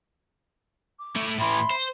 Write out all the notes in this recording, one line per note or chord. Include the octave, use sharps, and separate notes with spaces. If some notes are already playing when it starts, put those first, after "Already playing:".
D6
A3 E4
A2 E3 E5 B5 C6
C5